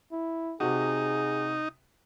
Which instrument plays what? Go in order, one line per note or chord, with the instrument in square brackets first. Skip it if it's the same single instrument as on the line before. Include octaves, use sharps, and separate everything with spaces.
[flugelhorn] E4
[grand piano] C3 F#4 [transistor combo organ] D#4 [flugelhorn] G#4